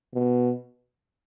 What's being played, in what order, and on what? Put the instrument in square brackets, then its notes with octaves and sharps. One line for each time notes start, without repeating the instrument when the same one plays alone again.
[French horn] B2